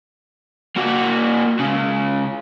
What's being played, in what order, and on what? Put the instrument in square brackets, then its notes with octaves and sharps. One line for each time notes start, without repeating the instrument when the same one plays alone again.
[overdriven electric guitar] A#3 F#4
C#2 C#3